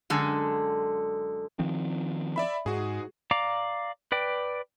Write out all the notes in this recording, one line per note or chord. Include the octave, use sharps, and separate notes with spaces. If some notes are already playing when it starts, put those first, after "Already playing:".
F#2 D3 G#3 A4
D#3 F3 C4
D5 E5 B5
G#2 F#4 G#4
D5 F5 A#5 D6
B4 D5 G5